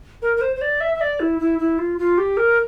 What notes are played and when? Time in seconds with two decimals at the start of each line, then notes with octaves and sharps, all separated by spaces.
0.22 A#4
0.37 A#4
0.41 C5
0.56 C5
0.62 D5
0.81 E5
0.95 E5
1.01 D5
1.20 E4
1.40 E4
1.59 E4
1.78 F4
1.99 F4
2.18 G4
2.37 A#4